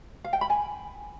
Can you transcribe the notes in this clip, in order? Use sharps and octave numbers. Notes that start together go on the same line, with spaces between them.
F5
G5
B5
G#5